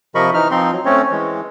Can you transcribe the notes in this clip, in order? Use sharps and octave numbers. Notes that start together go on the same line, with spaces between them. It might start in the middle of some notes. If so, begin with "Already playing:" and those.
C3 F3 A#4 D#5 B5 C#6
E3 D#4 F6
F3 C4 D#4 C6
F#3
A3 C4 C#4 C#5
E3 G#3